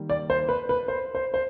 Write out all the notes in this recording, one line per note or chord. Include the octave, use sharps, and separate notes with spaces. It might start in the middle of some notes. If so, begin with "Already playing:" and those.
Already playing: D#3 G3 A#3
D5
C5
B4
B4
C5
C5
C5